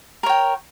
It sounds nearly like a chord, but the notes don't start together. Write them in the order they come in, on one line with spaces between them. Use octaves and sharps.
A#4 C#5 G5